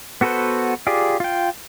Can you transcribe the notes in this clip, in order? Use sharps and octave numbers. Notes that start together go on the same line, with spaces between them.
B3 F#4 A4 B4 C5
F4 G4 G#4 D5
F4 G5